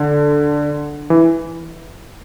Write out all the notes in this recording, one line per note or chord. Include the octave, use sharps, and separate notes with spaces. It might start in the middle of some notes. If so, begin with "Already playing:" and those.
Already playing: D3
E3